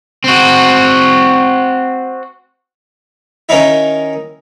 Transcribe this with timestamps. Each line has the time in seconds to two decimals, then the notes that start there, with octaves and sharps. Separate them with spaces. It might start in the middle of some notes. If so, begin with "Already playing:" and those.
0.24 C4 F#4
3.49 D#3 C#4 D#4 E4